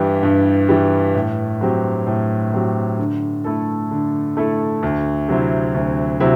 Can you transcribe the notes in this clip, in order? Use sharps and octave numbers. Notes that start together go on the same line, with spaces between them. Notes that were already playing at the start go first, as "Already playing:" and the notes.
Already playing: G2 E3 G3
G2
E3 G3
A2
F#3 C4 G4
A2
F#3 C4 G4
D3
A3 E4 A4
D3
A3 E4 A4
D2
C3 F#3 C4 E4
D2
C3 F#3 C4 E4